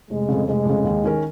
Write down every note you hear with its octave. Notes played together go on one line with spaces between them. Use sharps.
F1 G#3
F2 C#3
F1 G#3
F2 C#3
D#2
D#3 C#4 A#4